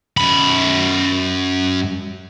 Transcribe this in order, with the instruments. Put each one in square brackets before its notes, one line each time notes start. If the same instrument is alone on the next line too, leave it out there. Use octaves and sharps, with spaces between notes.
[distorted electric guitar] F#2 B5